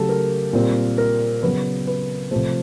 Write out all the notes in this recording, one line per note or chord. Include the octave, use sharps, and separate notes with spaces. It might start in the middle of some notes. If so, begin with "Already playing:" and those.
Already playing: C#3 F#3 A3 G4 A4
A#4
A#2 G3 C4
A#4
C#3 F#3 B3 B4
B4
C3 F3 A3 C5